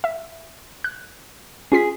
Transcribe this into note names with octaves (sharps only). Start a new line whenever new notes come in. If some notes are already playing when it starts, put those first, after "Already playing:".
E5
F#6
C#4 F4 G#4 B6